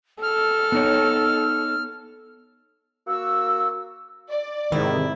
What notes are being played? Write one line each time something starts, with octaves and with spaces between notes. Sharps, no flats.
A4 F6
B3 D#4 C#5
A#3 F#4 E6
D5
G#2 C3 D#3 E4